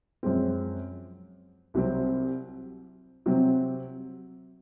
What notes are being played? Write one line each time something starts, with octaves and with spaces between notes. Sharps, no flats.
F#2 F3 G#3 C4
C2 C3 F#3 C4
C3 F#3 C4